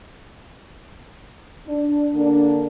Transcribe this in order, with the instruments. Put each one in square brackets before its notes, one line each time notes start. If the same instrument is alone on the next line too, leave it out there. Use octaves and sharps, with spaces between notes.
[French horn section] D4
D3 A#3 D4